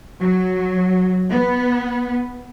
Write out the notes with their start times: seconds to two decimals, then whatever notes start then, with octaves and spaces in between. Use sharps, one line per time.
0.21 F#3
1.30 B3